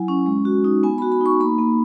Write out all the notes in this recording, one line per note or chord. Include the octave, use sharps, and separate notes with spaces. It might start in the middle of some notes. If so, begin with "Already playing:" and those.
Already playing: F#3 E4 G#5
C#4
G#3
F#4
D#4
B3 G#5
B5
F#4
B5
D#4 C#6
A#3 B5
A#3